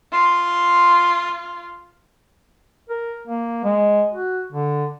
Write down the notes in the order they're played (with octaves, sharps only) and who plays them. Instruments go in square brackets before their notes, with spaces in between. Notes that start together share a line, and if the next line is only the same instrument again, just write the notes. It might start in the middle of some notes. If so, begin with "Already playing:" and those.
[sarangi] F4 [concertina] C6
[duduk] A#4
A#3
G#3
F#4
D3